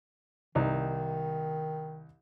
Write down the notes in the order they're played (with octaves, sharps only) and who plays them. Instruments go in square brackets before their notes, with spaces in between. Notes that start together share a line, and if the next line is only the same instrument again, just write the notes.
[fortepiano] C2 D#4 [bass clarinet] D#3